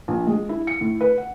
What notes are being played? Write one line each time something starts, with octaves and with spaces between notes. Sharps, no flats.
A#1
G#3
E4
C#7
A2
B4
F#5